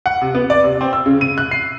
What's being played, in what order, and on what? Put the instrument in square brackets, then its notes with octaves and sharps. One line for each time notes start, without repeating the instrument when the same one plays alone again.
[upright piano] F#5
C3
B3
D5
C3
C4
E6
C#3
D#7
F#6
C7